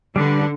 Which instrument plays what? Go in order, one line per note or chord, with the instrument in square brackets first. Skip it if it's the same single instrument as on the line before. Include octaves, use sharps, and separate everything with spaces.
[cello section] D3 [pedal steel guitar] G3 D4 B4